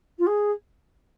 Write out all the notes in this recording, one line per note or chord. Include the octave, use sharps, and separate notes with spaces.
F4
G#4